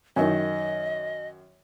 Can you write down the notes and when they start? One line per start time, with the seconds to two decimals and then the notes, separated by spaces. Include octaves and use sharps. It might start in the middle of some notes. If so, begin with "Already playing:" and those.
0.16 F#2 D#3 D#5